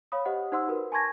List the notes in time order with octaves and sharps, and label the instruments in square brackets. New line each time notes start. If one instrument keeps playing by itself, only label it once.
[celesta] C#5 F5 B5 D#6
G4 C5 D#5 F#5
D#4 C5 F#5 C6 E6
F#4 A#4 B4
G#5 A5 C6 C#6 G#6 A#6